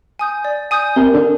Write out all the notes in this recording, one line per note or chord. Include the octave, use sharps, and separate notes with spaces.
G#5 D#6 G6
D5
G#5 D#6 G6
C3 A#4
D3